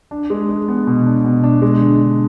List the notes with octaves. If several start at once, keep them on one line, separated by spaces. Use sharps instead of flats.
D4
G#3
G#3
B3
B2
D4
B2
D4
G#3
D3
D3